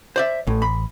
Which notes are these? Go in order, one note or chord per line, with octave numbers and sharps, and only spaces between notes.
C5 D5 E5
A1 A2
B5